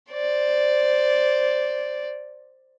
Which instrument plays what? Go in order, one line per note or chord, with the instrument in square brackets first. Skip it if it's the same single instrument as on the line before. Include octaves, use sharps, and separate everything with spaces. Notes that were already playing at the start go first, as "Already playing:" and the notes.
[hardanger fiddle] C5 D5